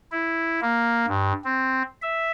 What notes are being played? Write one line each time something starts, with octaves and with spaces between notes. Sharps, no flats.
E4
A#3
G2
C4
E5